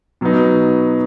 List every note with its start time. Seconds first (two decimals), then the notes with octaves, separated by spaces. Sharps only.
0.21 B2 F#3 B3 D#4